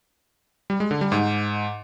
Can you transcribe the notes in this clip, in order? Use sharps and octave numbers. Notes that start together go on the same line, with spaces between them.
G3
G#3
D3
G3
G#2